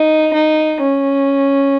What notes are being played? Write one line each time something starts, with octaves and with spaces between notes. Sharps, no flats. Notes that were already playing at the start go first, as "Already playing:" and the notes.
Already playing: D#4
D#4
C#4